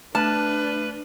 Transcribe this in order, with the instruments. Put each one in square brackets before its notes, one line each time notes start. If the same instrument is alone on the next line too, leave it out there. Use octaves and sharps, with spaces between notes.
[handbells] A3 F6 [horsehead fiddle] D4 [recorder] B4 [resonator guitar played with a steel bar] A5